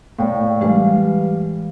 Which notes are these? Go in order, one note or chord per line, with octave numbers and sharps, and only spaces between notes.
A2 D5 F5 G5
E3 G3 G#3 B4 F5